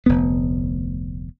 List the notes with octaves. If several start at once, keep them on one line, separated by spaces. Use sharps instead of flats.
F1 D2 B3